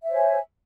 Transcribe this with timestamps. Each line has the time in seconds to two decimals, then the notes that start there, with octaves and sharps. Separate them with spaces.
0.03 E5
0.07 C5
0.11 C#5
0.14 G#5